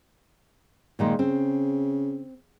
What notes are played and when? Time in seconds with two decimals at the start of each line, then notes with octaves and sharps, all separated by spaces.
0.99 A#2 D#3 G#3
1.19 C#3 C4